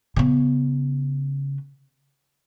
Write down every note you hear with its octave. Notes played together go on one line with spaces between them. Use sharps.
C#3 B3